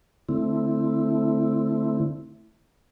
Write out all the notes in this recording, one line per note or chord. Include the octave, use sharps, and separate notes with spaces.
D3 A3 C4 E4